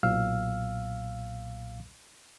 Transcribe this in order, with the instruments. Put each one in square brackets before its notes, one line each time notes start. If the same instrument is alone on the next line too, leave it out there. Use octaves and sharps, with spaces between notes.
[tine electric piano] B1 A#2 F5 E6 F6